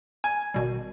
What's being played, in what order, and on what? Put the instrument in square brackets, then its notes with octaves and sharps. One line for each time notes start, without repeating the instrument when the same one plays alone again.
[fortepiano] G#5
[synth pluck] G#1 B2 G3